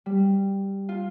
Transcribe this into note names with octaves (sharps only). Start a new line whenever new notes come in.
G3
F4